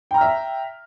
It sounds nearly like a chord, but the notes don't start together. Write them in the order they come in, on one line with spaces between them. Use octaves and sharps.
G5 A#5 F6 E5